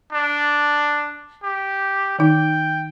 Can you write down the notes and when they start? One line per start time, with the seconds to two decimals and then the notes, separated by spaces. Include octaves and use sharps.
0.13 D4
1.43 G4
2.19 D#3 D#4 G5